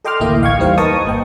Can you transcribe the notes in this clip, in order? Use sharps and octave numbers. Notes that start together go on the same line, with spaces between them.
A4 D#5 G5 C6 D6 F6
A1 D2 A#3 E4 D#5
F5 G5 C#6 G#6
E2 G3 D#4 C5 F5
A#4 B4 D#5 A5 C#6 D#6
G1 A#3 G5